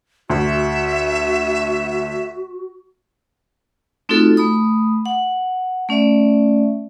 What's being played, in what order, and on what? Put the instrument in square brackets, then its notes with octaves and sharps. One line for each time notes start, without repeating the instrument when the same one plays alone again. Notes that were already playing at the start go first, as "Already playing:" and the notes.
[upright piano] D2 [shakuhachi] F#4 [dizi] E5
[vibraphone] A3 C4 D#4 F4 F#4 A4
A3 B5 D#6
F#5
A3 C#4 D5 E5